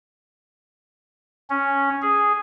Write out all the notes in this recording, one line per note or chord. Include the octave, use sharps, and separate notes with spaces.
C#4
G#4